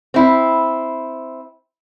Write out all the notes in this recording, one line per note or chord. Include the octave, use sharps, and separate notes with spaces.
C4 E4